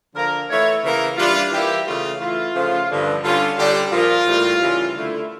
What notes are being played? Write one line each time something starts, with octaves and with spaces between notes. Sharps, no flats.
D3 F3 A#3 A#4
E3 A3 E4 C#5
C#3 E3 A#3 A#4
E3 G3 D4 F4
E3 G3 A#3 E4 G4
C#3 E3 A3 F4
E3 A3 E4 F4
C#3 F3 A3 C#4
G2 D3 F3
D3 G3 C#4 F4
D3 G3 D4 G4
A#2 F3 A#3 F4
A2 E3 G3 A#3
C#3 E3 G3 A#3
D3 A3 E4